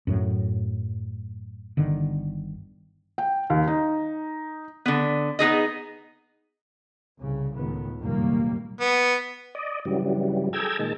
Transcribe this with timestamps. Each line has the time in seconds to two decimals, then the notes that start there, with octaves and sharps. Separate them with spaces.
0.07 F#2 A2 F#3
1.77 G1 D3 D#3
3.18 G5
3.50 D#2
3.68 D#4
4.86 D3 B3
5.39 B3 D#4 G#4 D#5
7.19 C2 C#3
7.54 C#2 A2 D#3 B3
7.99 F1 F#2 A#2 D#3 G3 A#3
8.81 B3
9.55 D5 D#5
9.85 G2 C#3 E3 F#3 G3
10.53 G#4 A4 G5 A#5 E6 G#6
10.79 A#2 D#3 G#3 A5